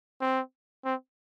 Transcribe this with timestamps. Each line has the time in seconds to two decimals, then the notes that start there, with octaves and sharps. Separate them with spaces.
0.21 C4
0.85 C4